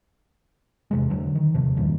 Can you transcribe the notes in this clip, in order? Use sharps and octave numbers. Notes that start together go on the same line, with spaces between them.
E2 C3 G#3
D3 F#3
D#3
D#2 C3 F3
E2 G2 A#2 D#3